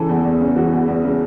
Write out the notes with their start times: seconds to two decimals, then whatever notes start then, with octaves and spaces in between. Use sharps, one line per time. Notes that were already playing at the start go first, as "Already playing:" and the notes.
Already playing: C#3 E3 A4
0.09 E2
0.25 E2
0.41 C#3
0.56 E3 F#4
0.72 E2
0.88 E2
1.04 C#3